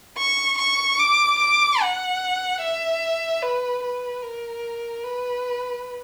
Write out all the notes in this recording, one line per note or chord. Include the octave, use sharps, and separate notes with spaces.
C#6
C#6
D6
D6
F#5
E5
B4
B4
A#4
B4